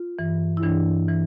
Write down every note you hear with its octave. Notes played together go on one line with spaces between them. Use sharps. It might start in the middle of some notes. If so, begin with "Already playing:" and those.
Already playing: F4
G2 E3
E4
G2 E3 D4
E3